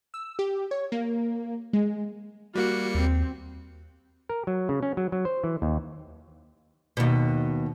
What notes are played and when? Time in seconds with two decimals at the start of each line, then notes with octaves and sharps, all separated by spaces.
0.14 E6
0.39 G4
0.71 C#5
0.92 A#3
1.73 G#3
2.55 G3 A#3 F#4 C#7
2.95 D#2 C4
4.29 A#4
4.47 F#3
4.69 C#3
4.83 C#4
4.97 F#3
5.12 F#3
5.25 C5
5.44 E3
5.62 D#2
6.97 D#2 B2